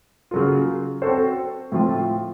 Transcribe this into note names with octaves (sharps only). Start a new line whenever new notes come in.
C#3 F#3 A#3 F4
C4 F#4 A4 C5
A2 F3 C4 F4